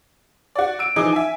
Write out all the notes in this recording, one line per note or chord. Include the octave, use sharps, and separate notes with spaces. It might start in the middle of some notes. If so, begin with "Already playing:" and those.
F#4 D5
E6 D7
E3 F3 D#4 G#4 D6
E5 G#5